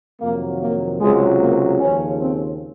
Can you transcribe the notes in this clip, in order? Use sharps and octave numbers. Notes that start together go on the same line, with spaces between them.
F2 C3 D#3 F#3 A#3
A#3
C#2 C3 F#3 G#3
A#3
D#2 C#3 F3 C#4
C4